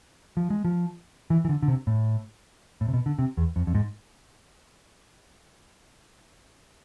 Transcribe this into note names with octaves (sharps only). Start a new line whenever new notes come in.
F3
G#3
F3
E3
E3
D3
D3
C3
A2
A2
C3
B2
D3
C3
E2
F2
F2
G#2